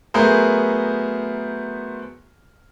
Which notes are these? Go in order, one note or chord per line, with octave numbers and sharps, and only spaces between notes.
F#3 A3 B3 G#4 A#4 C5